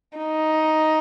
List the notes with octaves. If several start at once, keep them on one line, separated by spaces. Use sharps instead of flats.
D#4